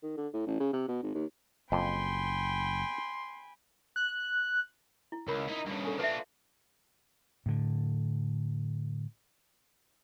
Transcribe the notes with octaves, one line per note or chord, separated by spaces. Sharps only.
D#3
D3
A2
A1
C#3
C3
B2
G#1
D#2
F#1 F2 G5 G#5 B5 C6
F#6
E4
C#2 A#4 B5
D#4 E4
G2 C#3
A4 G#5
D4 F4 B4 E5
A2 D3